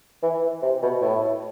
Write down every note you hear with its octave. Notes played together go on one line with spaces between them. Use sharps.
E3
C3
B2
A2